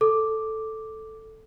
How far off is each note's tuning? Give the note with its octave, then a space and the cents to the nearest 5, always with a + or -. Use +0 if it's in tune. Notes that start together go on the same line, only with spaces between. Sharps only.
A4 +0 D6 +0